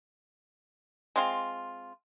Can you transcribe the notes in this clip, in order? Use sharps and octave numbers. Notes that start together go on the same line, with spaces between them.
G#3 C4 F4